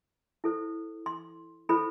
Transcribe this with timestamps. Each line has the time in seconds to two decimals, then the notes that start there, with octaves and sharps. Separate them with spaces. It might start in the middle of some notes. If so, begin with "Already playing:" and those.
0.44 E4 A4 C5
1.06 C6
1.69 E4 A4 C5 B5